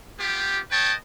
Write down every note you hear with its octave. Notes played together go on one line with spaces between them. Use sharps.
B3 F4 G4
B4 C#5 D#5 G5 A5